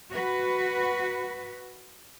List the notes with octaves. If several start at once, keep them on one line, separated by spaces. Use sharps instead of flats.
F#4 B4